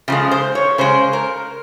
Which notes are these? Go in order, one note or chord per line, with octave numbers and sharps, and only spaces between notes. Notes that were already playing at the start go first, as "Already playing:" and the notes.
C#3 F3 G#3
C5
C#5
C#3 G#3 C5
A#4